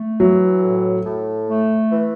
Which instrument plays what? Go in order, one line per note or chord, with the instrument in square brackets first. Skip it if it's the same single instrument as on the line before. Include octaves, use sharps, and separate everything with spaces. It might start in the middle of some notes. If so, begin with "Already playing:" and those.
Already playing: [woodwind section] A3
[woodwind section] E3 [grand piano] F#3
[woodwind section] A2
A2
A3
E3